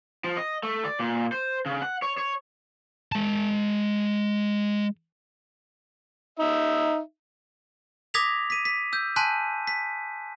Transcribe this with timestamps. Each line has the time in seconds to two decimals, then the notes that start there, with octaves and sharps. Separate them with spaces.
0.24 F3
0.37 D#5
0.63 A3
0.85 D5
1.00 A#2
1.32 C5
1.66 C#3
1.82 F#5
2.02 C#5
2.18 C#5
3.12 G#3 A5
6.39 D#4 E5
8.14 D6 D#6 G#6 A#6 B6 F7
8.50 B6 D#7
8.65 B6
8.93 E6 G6
9.16 G#5 A5 C6 F#6 B6 D#7
9.67 B6